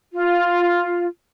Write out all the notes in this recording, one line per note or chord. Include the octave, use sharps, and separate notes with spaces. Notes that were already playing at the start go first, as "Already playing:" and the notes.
F4